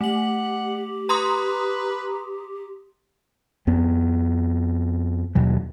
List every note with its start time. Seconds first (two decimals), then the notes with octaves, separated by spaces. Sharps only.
0.01 A3 G4 F#5 F#7
1.09 B4 A#5 C6 D#6
3.67 F2 B3
5.35 D#2 B2 F#3